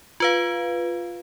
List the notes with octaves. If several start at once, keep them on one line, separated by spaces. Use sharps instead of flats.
F4 B4 F5